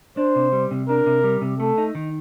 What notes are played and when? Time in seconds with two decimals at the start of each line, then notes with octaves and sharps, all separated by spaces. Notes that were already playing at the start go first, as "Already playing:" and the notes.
0.17 D4 C5
0.36 C3
0.52 G3
0.71 C3
0.89 D4 A#4
1.06 C3
1.24 G3
1.42 C3
1.59 A3 A4
1.78 D#4
1.95 D#3